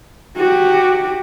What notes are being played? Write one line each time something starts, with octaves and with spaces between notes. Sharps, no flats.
F#4 G4